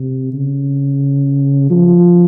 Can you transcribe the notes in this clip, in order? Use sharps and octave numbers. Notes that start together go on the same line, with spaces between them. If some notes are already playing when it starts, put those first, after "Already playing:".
Already playing: C3
C#3
F3